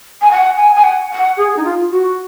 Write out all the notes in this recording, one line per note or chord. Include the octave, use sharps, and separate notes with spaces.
G#5
F#5
G#5
G#5
F#5
F#5
G#4
D#4
F4
F#4